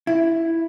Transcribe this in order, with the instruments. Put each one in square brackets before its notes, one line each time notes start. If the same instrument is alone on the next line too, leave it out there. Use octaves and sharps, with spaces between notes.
[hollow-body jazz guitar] E4